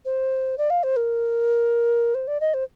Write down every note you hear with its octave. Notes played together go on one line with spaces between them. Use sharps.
C5
D5
F5
C5
A#4
C5
D5
D#5
C5